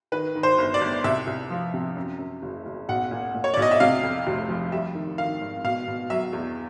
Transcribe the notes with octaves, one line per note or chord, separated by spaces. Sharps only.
D#3 B4
D#3
C5
G1
D5
G1
C2 E5
C2
F3
C3
F#2
F#2
F#1
F#1
B1 F#5
A#2
A#2
C#5
B1 D5
D#5
E5
C3 F5
F2
F1
F3
G3 E5
D#3
D#3 F5
G#1
B2 F5
B2
F#3 E5
E2